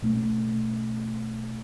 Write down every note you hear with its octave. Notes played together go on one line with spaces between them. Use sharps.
B2 A3 C#4